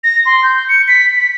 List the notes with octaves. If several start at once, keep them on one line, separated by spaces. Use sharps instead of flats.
A#6
C6
G6
C#7
B6
B6